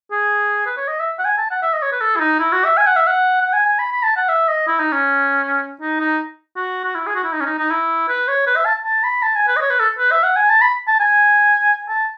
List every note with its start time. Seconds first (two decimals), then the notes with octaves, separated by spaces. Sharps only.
0.12 G#4
0.66 B4
0.77 C#5
0.88 D#5
1.00 E5
1.19 F#5
1.25 G#5
1.38 A5
1.51 F#5
1.63 E5
1.73 D#5
1.83 C#5
1.92 B4
2.01 A4
2.16 E4
2.20 D#4
2.40 E4
2.53 F#4
2.65 E5
2.77 G#5
2.87 F#5
2.96 E5
3.07 F#5
3.42 F#5
3.53 G#5
3.65 G#5
3.79 B5
3.92 B5
4.03 A5
4.17 F#5
4.29 E5
4.48 D#5
4.67 E4
4.79 D#4
4.92 C#4
5.81 D#4
6.00 D#4
6.57 F#4
6.84 F#4
6.95 E4
7.07 G#4
7.15 F#4
7.24 E4
7.33 D#4
7.40 C#4
7.46 D#4
7.59 D#4
7.71 E4
8.09 B4
8.28 C#5
8.47 B4
8.57 E5
8.66 A5
8.84 A5
9.04 B5
9.23 A5
9.35 G#5
9.48 B4
9.57 D#5
9.61 C#5
9.70 B4
9.80 A4
9.99 B4
10.12 E5
10.24 F#5
10.36 G#5
10.49 A5
10.62 B5
10.88 A5
11.00 G#5
11.89 A5